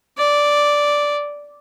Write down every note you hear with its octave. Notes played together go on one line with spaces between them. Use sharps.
D5